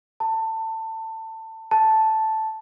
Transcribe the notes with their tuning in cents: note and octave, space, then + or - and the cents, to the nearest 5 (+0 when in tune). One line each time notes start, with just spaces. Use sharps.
A5 +20
A5 -5